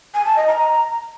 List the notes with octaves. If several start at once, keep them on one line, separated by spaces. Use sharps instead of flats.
G#5
A5
D#5
A#5